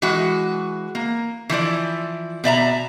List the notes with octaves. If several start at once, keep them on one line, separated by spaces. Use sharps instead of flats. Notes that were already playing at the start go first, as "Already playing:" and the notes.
E3 G#3 F#4
A#3
E3 F3 E4 D5
B2 D5 E5 A#5